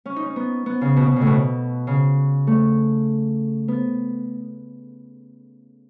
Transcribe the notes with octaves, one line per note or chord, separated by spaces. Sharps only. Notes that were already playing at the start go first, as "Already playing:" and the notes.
C#4
D#4
C#4
B3
B3
C#3
B2
B2
C#3
A2
B2
C#3
A3
B3